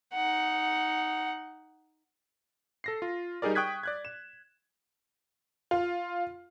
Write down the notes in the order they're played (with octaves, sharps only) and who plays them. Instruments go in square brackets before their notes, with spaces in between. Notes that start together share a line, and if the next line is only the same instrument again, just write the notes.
[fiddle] D#4 F#5
[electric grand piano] A4 A#6 C7
F4
G3 D#4 G4 G#4 A#4 D5
G5 C#6 D#6 F#6 G#6 B6
D5 F#6 G#6
E7
[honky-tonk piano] F4